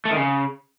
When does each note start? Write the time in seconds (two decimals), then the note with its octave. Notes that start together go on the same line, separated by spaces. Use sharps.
0.05 A3
0.11 D#3
0.17 C#3